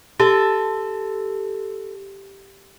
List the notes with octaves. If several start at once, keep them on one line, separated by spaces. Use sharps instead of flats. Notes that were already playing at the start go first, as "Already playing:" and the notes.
G4 A4